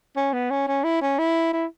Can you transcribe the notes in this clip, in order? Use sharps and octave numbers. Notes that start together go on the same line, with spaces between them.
C#4
B3
C#4
C#4
E4
C#4
E4
E4